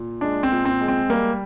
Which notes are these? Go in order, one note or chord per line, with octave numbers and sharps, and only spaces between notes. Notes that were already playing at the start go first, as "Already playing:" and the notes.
Already playing: A#2
G#3 D4
C4
A#2
C4
G#3
C4
G3 A#3